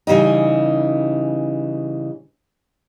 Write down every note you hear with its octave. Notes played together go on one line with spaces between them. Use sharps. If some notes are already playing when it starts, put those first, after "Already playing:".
C#3 E3 G3 D#4